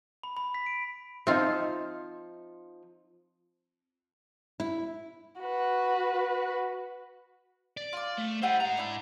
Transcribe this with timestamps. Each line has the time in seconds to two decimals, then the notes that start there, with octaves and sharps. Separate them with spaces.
0.23 B5
0.37 B5
0.54 B6
0.66 D7
1.27 F3 C4 D#4 F4 E5
4.60 E4
5.41 F#4 B4
7.77 D5
7.93 F4 D6
8.18 A3
8.42 E4 G4 C5 D#5 F#5
8.60 G#2 F#5 A#5
8.77 D4 E4